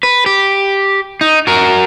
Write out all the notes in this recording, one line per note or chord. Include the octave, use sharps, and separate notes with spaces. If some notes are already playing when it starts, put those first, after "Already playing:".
B4
G4
D#4
F#4 A#4